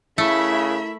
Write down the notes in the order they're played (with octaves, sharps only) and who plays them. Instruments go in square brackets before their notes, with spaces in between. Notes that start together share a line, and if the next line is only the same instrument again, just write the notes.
[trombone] C#3 [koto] A3 [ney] E4 [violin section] A#4 E5 B5